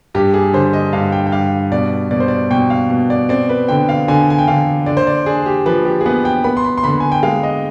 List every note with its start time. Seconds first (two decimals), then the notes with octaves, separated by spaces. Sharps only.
0.15 G2 G4
0.34 G#4
0.53 D3 C5
0.73 D#5
0.93 G2 F5
1.12 G5
1.26 G5
1.32 G2 F5
1.72 B2 D5
2.11 B2 D5
2.20 C5
2.28 D5
2.51 B2 G5
2.70 F5
2.90 B2
3.10 D5
3.29 C4 D5
3.49 B4
3.69 D3 G5
3.89 F5
4.08 D3 G#5
4.30 G#5
4.38 G5
4.48 D3 F5
4.86 D3 D5
4.97 C5
5.07 D5
5.26 D4 G#4
5.46 G4
5.66 F3 B4
5.85 G4
6.01 G#4
6.05 B3 B4
6.25 G5
6.44 B3 B5
6.57 C6
6.64 B5
6.77 C6
6.84 D3 B5
7.00 G#5
7.12 G5
7.23 G#3 F5
7.43 D#5